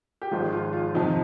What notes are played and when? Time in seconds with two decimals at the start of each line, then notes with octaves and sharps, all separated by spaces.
0.22 G4
0.31 G#1 G#2 F3 G#3 F4
0.53 F4
0.73 F4
0.94 F2 C3 F3 D#4